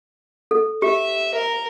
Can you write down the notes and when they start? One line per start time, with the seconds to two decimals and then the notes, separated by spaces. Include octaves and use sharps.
0.51 A4
0.82 G4 E5
1.34 A#4